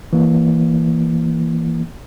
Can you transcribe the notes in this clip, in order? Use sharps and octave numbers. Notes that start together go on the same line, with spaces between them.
E3 A#3